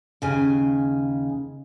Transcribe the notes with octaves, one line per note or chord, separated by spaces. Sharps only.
D#2 C#3 G#5